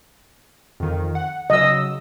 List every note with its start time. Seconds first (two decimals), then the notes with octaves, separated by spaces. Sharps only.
0.80 F2 D#3
1.15 F#5
1.50 C#3 F#3 D#5 E6